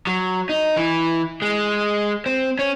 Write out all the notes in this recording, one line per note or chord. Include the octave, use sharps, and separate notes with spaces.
F#3
D#4
E3
G#3
C4
C#4